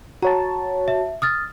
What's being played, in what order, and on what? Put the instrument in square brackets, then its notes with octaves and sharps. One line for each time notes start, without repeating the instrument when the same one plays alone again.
[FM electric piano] F#4 C#5 A5 [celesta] A#5
[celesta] E5
D#6 F6 A6